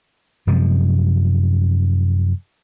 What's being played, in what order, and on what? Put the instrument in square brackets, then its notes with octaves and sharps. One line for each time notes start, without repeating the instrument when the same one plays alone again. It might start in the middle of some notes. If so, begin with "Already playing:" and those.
[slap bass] F#2 C3 F3 G#3